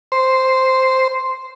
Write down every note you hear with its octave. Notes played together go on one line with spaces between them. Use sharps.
C5